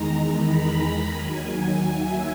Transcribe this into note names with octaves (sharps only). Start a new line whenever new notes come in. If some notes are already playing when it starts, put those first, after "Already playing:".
Already playing: E2 D#3 G#3 A#5
B5
D#2 D#3 F#3 G#5
E5